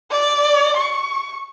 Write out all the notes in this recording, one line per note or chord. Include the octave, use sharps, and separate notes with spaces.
D5
C#6